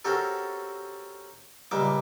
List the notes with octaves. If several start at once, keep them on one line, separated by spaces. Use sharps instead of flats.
C4 C#4 F#4 G4 A4 A#4
C#2 A#2 G3 A#3 E5 D6